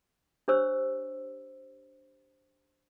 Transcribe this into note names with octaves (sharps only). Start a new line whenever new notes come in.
D4 G4 C5 C#5 E6